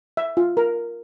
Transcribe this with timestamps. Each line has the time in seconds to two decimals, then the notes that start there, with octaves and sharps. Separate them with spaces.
0.17 E5
0.37 F4
0.57 A#4